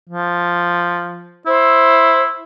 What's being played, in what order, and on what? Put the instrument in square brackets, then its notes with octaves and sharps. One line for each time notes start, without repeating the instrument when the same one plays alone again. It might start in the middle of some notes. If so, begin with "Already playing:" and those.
[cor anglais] F3
[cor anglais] E4 [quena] C5